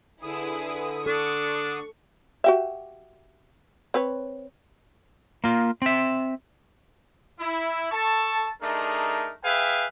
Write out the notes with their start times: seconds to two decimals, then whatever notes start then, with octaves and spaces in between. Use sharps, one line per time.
0.23 D3 E4 G#4 B4 D#6
1.06 D4 A4 C#6
2.44 F#4 G4 E5
3.94 C4 B4 C#5
5.44 A#3 F4
5.82 C4 E5
7.40 E4
7.91 A4 A5 C#6
8.61 A3 D4 D#4 G#4 A#4
9.44 G#4 B4 E5 F5 G5 G#5